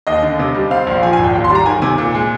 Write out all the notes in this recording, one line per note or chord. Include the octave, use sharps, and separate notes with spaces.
D#2 D#5
D3
C3
G3
C4 F5
A#1
F3 G#5
G#5
G#1
G5
D#2
C6
G3
A#5
D#3 G#5
C3 G#5
A#2
G#3